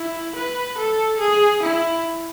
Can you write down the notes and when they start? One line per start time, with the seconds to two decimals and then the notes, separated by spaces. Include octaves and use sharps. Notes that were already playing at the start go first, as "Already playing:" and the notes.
Already playing: E4
0.35 B4
0.77 A4
1.20 G#4
1.62 E4